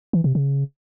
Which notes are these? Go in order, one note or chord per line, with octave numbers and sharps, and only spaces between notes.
E3
C3
C#3